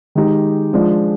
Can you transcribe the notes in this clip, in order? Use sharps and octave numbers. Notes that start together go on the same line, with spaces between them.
D#3 G#3 D#4 G4
F3 G#3 D4